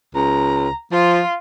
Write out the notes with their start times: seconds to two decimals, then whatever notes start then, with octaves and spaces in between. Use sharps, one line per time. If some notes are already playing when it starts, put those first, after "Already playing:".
0.15 C#2 A#5
0.92 F3 F4